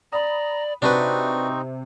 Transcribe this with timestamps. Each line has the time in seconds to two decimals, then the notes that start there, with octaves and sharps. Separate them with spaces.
0.12 D5 A#5 B5 D#6
0.82 C3 C4 D4 D#4 F#4 B4 C#6